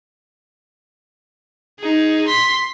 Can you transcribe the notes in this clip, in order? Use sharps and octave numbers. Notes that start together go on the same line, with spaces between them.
D#4 G#4
C6 B6